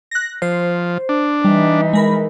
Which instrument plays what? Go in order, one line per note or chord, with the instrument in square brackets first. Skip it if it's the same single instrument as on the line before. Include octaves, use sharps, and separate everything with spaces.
[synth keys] F#6 A#6
[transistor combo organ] F3 [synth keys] C5
[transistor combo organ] D4
[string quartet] E3 D#4 [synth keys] G3
[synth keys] G#3 A#4 B5